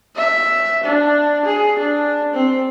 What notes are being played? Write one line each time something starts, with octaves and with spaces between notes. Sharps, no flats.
E5
D4
G#4
D4
C4